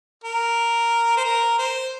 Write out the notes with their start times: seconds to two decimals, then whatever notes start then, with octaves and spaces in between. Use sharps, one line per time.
0.24 A#4
1.17 C5
1.25 A#4
1.58 C5